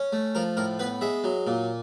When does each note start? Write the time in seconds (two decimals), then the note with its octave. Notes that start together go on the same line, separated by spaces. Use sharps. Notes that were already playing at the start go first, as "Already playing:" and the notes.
Already playing: C#4
0.12 A3
0.35 F3 A#4
0.57 A2 A#4
0.79 B3 B4
1.01 G#3 E5
1.24 F#3
1.47 A#2